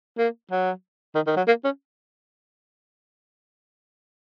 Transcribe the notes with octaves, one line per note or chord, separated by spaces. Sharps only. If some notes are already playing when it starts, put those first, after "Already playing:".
A#3
F#3
D#3
D#3
F#3
A#3
C#4